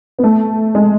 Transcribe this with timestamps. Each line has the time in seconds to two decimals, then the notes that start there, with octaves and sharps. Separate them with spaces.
0.19 B3
0.23 A3
0.75 G#3